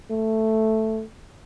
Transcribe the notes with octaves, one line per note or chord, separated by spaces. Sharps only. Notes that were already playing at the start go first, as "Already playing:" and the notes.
A3